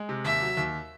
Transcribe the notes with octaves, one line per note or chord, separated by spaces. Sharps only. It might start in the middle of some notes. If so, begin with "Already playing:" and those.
Already playing: G#3
C3
D#2 E5
F#3
D#2